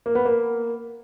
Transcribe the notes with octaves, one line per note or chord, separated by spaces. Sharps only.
A#3
B3
A#3